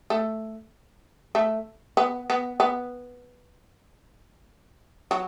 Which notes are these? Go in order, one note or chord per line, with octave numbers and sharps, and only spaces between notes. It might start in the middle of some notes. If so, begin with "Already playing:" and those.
A3
A3
B3
B3
B3
F#3